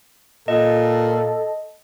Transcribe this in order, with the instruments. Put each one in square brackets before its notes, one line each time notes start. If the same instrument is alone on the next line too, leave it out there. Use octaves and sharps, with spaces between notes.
[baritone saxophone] A#2 [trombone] A4 [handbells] D#5